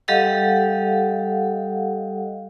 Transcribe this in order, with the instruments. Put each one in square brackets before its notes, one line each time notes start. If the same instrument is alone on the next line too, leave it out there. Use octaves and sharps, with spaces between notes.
[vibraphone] G3 G4 A4 D#5 F5 F#5